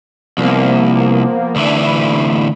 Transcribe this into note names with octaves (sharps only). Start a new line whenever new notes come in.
C2 F3 A#3 B3
D2 E3 D4
B5